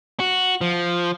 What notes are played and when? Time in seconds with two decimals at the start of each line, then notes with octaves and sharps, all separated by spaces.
0.20 F#4
0.61 F3